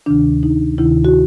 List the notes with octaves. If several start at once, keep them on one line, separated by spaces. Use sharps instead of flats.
D2 C3 D#3 D4
D#4
D2 C3 D#3 E4
F#4